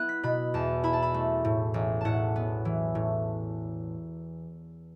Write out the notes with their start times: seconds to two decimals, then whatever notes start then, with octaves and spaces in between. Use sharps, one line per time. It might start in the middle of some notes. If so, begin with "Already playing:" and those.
Already playing: B3 E4 F#6
0.09 B6
0.23 B2 B5
0.54 E2 A5
0.84 E4 B5
0.93 A5
1.02 B5
1.14 A3
1.45 A2
1.74 A1
2.01 A2 F#5 A5
2.36 B3
2.65 E3
2.95 A2